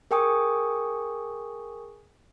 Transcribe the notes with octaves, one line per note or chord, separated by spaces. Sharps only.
G#4 A#4 G5 G#5 C#6 D#6